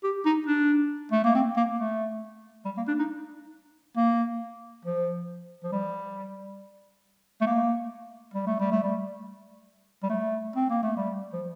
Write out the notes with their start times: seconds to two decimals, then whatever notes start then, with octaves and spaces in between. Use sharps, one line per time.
0.04 G4
0.26 D#4
0.47 D4
1.12 A3
1.24 A#3
1.35 C4
1.57 A#3
1.79 A3
2.66 G3
2.77 A#3
2.88 D4
2.99 D#4
3.97 A#3
4.85 F3
5.64 F3
5.72 G3
7.42 A3
7.47 A#3
8.34 G3
8.47 A3
8.60 G3
8.72 A3
8.84 G3
10.03 G3
10.10 A3
10.56 C4
10.70 A#3
10.83 A3
10.97 G3
11.33 F3